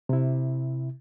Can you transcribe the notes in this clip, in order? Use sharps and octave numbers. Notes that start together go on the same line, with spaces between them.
C3 E4